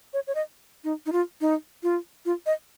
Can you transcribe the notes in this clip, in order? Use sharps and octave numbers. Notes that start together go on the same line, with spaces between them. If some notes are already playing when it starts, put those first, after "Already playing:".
C#5
C#5
D#5
D#4
D#4
F4
D#4
F4
F4
D#5